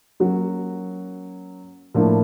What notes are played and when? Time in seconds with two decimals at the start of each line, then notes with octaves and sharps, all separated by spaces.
0.20 F#3 A#3 C#4 F#4
1.94 A2 F3 A#3 D4